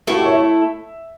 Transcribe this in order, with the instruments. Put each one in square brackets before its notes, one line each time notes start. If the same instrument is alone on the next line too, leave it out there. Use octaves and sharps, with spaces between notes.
[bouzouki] A3 E4 A4 [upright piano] F#4
[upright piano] G4
C#5
E5